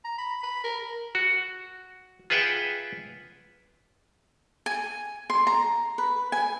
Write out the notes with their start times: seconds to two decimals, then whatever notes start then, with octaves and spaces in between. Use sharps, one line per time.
0.04 A#5
0.18 B5
0.43 B5
0.64 A#4
1.15 F#4
2.30 F4 G#4 B4 E5 F#5 G5
4.66 G#5
5.30 C6
5.47 A#5
5.98 B4
6.32 G#5